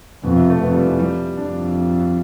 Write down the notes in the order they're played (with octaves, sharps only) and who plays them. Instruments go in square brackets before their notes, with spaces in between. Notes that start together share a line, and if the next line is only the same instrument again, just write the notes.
[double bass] F2 [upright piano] B2
[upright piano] C3
A3
[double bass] F2 [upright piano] B3
[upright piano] G3
E3
G3
[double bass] F2 [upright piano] D4